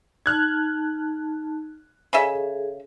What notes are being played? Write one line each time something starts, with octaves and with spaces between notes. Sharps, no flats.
D#4 A5 F6 F#6 G#6
C#3 G#4 A4 D#5 E5